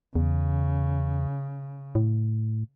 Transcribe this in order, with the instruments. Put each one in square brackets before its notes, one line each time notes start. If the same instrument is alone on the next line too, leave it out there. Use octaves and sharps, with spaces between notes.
[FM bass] E2 [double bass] C#3
[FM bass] A2